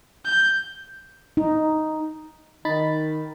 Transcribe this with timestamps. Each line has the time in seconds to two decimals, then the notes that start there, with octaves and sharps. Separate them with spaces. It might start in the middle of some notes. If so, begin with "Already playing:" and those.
0.25 G6
1.37 D#4
2.65 D#3 D#4 B5 A6